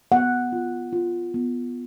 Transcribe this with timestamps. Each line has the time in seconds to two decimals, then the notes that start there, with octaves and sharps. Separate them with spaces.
0.12 B3 F#5
0.52 F4
0.92 F4
1.34 B3